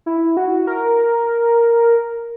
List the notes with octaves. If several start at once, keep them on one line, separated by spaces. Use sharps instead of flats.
E4
F#4
A#4